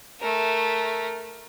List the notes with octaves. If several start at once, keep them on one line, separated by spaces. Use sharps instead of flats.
A3 A#4